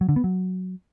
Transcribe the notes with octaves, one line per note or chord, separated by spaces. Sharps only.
F#3
D3
B3
F#3